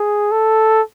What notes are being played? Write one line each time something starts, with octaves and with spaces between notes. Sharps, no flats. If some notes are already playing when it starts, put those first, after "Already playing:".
Already playing: G#4
A4